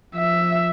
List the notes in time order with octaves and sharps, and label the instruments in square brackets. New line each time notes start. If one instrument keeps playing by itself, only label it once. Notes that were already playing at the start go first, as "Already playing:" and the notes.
[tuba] F3 [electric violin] E5